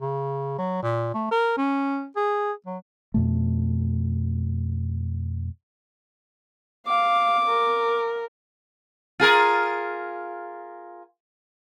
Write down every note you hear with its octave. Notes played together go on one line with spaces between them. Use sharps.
C#3
F#3
A#2
A3
A#4
C#4
G#4
F#3
F2 B2 A3
F5 D6
A#4
F4 G#4 A#4